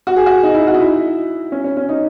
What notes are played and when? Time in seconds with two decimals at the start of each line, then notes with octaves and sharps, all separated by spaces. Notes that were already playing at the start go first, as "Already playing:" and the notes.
0.07 F#4
0.16 G#4
0.26 F#4
0.43 D#4
0.55 E4
0.68 F#4
0.74 D#4
0.80 E4
1.52 C#4
1.64 C#4
1.77 C#4
1.89 D#4